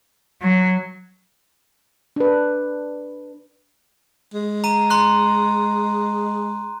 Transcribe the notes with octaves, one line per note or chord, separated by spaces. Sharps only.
F#3
D4 B4
G#3
A#5 D#7
A#5 C6 F#6